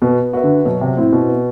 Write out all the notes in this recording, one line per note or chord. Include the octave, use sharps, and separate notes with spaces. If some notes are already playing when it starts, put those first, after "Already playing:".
B2 B3
F#4 B4 E5
D3
B2 F#3
C3
A2 C4 E4
B2
B3